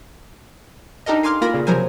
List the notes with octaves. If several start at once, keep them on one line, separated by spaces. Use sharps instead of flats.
D4 D#4 G4 A4 A#4 D#5
F5 G#5 C6 D6 F6
A#3 F4 A#4 B5 A#6
A#2 C#3
C3 F3 F#3 A#4 C5 G#5